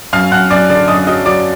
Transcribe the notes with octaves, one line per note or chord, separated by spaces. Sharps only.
F#2 F5 F6
F#2 F#5 F#6
F#2 D5 D6
D3 D5 D6
F#2 D#5 D#6
F#3 D#5 D#6
F#3 D5 D6